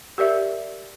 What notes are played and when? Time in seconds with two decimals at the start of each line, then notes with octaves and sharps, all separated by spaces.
0.18 G4 A#4 D5 E5